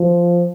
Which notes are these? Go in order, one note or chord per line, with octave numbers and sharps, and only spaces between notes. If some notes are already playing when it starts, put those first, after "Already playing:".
Already playing: F3